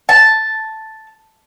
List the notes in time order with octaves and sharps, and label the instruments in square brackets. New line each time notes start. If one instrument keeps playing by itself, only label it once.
[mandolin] A5